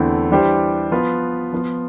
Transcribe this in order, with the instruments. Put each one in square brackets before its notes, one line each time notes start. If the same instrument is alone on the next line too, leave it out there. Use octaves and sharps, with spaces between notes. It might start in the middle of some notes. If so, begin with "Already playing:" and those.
Already playing: [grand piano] E2 D3 A3 C4 E4
E3 G3 D4 G4 C5
F3 B3 F4 B4
F3 B3 F4